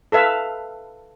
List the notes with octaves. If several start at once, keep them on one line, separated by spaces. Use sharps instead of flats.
A4 B4 E5 F5